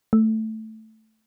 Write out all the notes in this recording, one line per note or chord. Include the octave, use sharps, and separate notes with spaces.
A3